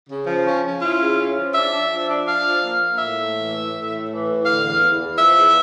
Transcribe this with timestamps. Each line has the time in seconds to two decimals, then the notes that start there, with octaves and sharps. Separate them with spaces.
0.08 C#3
0.26 F3
0.45 C#4
0.63 C#4
0.81 E4 F4
0.99 C#3
1.17 C#4
1.36 F3
1.54 D4 E5
1.71 D4
1.90 F3
2.09 D4
2.26 D4 F5
2.45 F3
2.63 A#3
2.81 A#3
2.99 A2 E5
3.17 A3
3.36 E3
3.53 A2
3.72 A2
3.90 A3
4.08 E3
4.27 A2
4.44 D3 F5
4.62 E2
4.81 E2
4.99 E2
5.17 F3 E5
5.36 E2